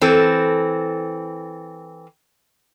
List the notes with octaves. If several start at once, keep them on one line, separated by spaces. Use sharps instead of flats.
E3 C4 A4